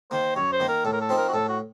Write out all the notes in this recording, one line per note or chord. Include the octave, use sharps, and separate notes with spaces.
D#3 A#3 C5
F#2 C#5
C5
D#3 A#3
A#4
A2 A4
A#4
A4
F3 C4 D#4
A#4
F#4
A2 A4
F#4